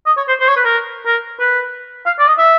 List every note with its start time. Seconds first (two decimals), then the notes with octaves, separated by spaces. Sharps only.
0.06 D#5
0.17 C#5
0.28 C5
0.40 C5
0.48 C#5
0.56 B4
0.65 A#4
1.06 A#4
1.40 B4
2.06 F5
2.19 D5
2.28 D#5
2.38 E5